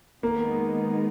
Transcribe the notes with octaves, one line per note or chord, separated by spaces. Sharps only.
D#3 G#3 A#3 B3 D#4